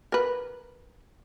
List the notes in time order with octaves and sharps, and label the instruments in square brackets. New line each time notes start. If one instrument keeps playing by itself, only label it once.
[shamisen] A#4 B4